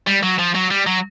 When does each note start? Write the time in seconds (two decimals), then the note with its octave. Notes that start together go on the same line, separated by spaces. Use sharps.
0.07 G3
0.23 F#3
0.39 F3
0.55 F#3
0.71 G3
0.87 F#3